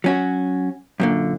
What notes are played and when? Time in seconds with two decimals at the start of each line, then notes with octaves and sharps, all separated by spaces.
0.04 F#3 C#4 F#4
1.00 F#2 A#2 D3